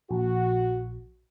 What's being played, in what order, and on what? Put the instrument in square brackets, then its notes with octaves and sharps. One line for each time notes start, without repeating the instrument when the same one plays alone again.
[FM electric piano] A#1 [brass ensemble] F#4